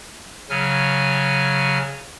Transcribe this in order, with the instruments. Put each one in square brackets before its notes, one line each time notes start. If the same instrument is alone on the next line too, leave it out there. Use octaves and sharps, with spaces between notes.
[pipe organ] C#3 F#3 G#5 F6